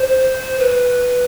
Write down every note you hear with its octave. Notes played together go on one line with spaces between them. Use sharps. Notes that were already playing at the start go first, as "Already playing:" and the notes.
Already playing: C5
B4